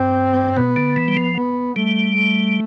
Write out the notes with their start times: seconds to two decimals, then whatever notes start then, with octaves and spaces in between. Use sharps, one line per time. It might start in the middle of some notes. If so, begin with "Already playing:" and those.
Already playing: G2 C4
0.57 B2 B3
0.76 D3
0.96 E3
1.08 G3
1.17 F3
1.36 B3
1.76 G3 A3
2.15 A3